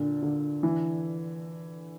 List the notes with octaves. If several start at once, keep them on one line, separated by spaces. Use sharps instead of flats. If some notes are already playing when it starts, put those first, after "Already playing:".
Already playing: A#2 D3
D3
E3